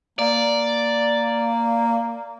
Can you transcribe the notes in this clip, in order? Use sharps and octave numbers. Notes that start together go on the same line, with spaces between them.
A#3 D5